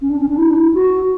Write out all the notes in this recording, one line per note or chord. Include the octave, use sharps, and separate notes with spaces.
C#4
D4
C#4
D4
E4
D4
E4
F#4